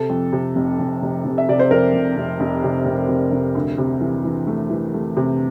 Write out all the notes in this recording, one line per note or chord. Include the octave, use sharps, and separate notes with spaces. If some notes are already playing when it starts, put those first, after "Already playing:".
Already playing: C3 A4
F2
C3
F1
F1
F1
F1
E5
C3 D5
C5
F2 A#4
F1
F1
F1
C3
F1
C3
F1
D2
C3
E3
E3
A3
E3
A3
C3